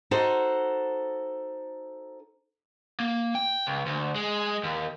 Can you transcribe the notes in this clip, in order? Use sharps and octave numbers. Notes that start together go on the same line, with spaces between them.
D#4 F#4 A4 C5
A#3
G5
C#2
D2
G#3
D#2